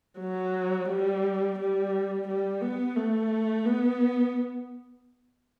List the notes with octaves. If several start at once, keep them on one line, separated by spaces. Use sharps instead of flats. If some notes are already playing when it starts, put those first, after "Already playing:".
F#3
G3
G3
G3
B3
A3
B3